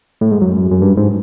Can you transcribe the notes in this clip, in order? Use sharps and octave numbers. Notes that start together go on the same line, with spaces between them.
A2
G#2
F#2
F#2
G2
G#2